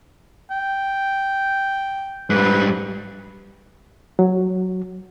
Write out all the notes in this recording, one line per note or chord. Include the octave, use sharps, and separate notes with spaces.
G5
G#2 G3 B4
F#3